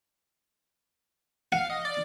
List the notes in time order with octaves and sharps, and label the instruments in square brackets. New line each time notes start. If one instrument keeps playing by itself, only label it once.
[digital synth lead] F5 [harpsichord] F#5
[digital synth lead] D#5
D5